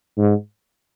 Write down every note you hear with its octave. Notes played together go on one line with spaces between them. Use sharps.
G#2